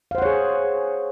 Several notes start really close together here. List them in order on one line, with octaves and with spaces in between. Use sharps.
F5 C5 F#5 C#5 G#4